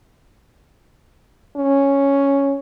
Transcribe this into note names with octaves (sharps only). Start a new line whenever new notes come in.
C#4